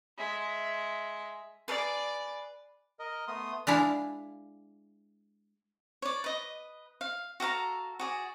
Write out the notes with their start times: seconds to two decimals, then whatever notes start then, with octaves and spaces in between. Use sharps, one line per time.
0.18 G#3 E5
1.68 G#4 B4 D5
2.99 A#4 D#5
3.28 A3 B3 C6 D#6
3.67 G#3 D4 E4 F5
6.02 C#5 D5
6.24 B4 D#5
7.01 F5
7.40 F#4 A4 F5 A#5
7.99 F#4 G#4 D5